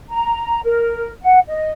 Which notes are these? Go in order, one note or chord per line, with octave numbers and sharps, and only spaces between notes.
A#5
A#4
F#5
D#5